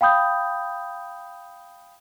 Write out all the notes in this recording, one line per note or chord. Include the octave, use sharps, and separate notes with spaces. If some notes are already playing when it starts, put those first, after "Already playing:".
F5 G5 B5 D#6 G6